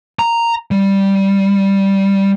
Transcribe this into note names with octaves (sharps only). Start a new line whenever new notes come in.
A#5
G3